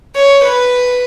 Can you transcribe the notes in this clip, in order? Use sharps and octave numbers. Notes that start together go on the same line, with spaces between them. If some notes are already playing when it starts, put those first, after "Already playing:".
C#5
B4